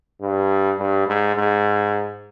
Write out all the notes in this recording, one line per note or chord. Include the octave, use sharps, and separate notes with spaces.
G2
G2
G#2
G#2